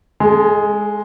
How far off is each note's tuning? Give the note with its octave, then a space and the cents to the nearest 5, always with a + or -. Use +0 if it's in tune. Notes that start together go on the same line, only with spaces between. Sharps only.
G#3 +0 A4 -35